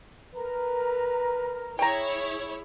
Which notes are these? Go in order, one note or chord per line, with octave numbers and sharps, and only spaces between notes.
A#4 B4 A#5
E4 G#4 C#5 G5 A#5